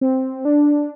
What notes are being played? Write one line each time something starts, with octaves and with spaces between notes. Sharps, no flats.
C4
D4